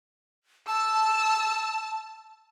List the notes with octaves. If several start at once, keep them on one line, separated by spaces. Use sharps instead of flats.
A5 E6